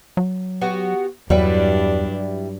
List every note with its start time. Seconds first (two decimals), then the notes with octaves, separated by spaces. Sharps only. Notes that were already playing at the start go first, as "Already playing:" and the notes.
0.17 F#3
0.61 B3 F#4 G4
1.30 E2 G2 F#3 G3 D4 E4 B4